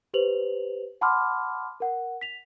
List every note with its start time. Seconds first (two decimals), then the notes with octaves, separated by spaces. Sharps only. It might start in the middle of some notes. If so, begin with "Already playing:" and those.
0.14 G4 B4 C5 F7 F#7
1.01 F#5 A5 B5 C6 D6 F6
1.80 A#4 F#5
2.21 B6 F7